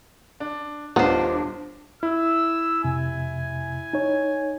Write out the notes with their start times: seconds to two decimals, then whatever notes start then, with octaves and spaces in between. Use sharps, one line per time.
0.40 D4
0.96 D#1 B3 D4 D#4 F4 C5
2.03 E4 E6
2.84 F2 C3 G#5
3.93 D#4 C#5